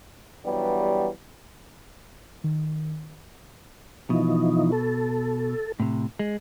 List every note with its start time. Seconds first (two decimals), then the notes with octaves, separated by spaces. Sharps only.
0.45 G2 E3 F#3 G3 B3
2.44 D#3
4.10 B2 E3 F3 D#4
4.72 A4
5.80 A2 C3
6.19 G#3